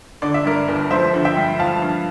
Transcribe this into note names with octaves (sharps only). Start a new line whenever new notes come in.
D3 D5
E5
G2 A#4 D5
G1
F3 C5 E5
D3
E5 G5
G2
F3 F5 A5
G2